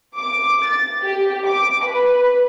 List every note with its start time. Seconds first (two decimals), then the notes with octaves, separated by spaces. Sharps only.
0.17 D6
0.67 A6
1.03 G4
1.46 D6
1.86 B4